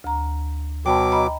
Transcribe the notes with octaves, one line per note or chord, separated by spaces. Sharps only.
D2 A#5
B2 F#3 G5 A5 B5 D6
D#5 A#5 B5